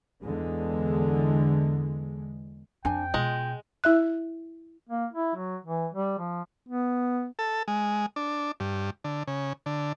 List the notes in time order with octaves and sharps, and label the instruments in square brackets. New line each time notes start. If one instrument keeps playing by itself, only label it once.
[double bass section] E2 D3 G#3
[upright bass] F2 [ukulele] D4 G#5 [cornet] G5
[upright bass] B2 [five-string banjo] G#3 D#5 [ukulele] F4
[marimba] E4 E5 F#6
[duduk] A#3
E4
F#3
E3
G3
F3
B3
[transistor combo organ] A4
G#3
D4
G2
D3
C#3
D3